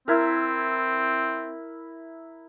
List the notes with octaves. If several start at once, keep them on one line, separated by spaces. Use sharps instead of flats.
C4 E4 A#4